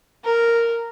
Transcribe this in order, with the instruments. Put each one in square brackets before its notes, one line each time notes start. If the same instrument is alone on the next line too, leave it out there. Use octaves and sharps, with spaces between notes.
[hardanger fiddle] A#4